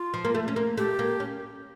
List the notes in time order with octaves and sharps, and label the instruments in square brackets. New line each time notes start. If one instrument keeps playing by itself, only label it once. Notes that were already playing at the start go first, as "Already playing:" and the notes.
Already playing: [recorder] F4
[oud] F3
A#3
A3
C#4
A#3
[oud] A3 [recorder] G4
[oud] A#3
C#4